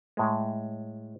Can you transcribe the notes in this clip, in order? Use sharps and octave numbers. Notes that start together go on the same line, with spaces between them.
A2 G#3